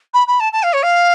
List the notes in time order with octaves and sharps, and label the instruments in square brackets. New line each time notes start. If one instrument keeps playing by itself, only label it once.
[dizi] B5
B5
A5
A5
F5
C#5
F5